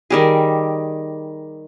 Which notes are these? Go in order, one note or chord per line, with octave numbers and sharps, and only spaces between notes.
D#3 G3 G#4